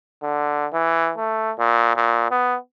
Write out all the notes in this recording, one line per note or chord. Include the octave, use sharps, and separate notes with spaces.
D3
E3
A3
A#2
A#2
B3